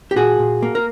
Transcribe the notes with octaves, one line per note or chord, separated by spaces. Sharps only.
G4
A#2 F#4 G#4
A#2
A#3
A#4